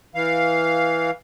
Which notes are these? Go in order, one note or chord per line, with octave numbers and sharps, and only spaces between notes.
E3 F5